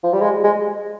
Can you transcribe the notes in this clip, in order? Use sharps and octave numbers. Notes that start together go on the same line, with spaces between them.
F3
G3
G#3
G#3